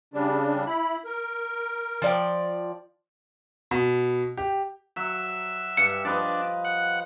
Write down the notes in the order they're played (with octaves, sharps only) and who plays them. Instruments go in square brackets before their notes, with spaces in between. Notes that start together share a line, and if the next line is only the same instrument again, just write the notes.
[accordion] C#3 G3 D4
E4 B5
A#4
[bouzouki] F3 D5 G5
[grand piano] B2
G4
[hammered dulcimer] F#3 [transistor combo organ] E5
[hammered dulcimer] G2 [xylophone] C#7
[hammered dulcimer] F3 B4 D#5 [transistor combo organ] D4
[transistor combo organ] F#5